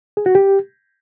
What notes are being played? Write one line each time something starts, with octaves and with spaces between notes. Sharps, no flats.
G#4
F#4
G4